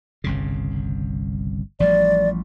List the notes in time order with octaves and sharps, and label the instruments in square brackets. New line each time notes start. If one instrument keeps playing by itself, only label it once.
[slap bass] G1 C2 C#3
[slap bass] A1 F3 G3 [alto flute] D5